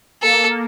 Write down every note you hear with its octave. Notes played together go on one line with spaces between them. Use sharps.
A#3 A4